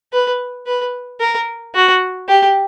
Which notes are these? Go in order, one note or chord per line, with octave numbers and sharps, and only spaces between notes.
B4
B4
A#4
F#4
G4